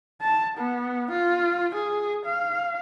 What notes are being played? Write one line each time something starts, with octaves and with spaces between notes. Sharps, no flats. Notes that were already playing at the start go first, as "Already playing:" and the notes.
A5
B3
F4
G#4
F5